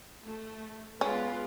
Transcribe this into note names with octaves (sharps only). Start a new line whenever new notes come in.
A3
G#3 B3 C#4 F4 B4 D5